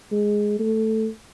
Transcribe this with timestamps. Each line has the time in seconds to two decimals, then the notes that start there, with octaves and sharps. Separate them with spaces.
0.12 G#3
0.59 A3